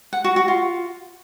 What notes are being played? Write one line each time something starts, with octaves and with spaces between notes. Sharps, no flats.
F#5
F#4
F#4
F4